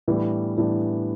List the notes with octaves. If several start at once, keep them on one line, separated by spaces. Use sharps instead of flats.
A2 E3 G3 B3 D4
A2 E3 G3 B3 D4